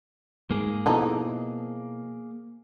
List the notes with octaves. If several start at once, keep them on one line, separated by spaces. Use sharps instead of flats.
G#2 A#3 G#4
B2 E3 F3 D#4 A4